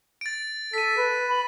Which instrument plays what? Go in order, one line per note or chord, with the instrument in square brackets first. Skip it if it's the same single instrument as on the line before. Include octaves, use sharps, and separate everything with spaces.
[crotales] A6 D7
[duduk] A4 [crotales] B6 D#7
[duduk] B4
[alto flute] B5